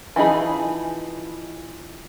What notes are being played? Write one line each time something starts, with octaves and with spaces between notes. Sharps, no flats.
E3 F3 D#4 G#4 B5